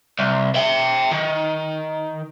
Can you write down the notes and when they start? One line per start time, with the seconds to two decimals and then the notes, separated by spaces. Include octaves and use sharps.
0.19 C2
0.55 E5 G5
1.12 D#3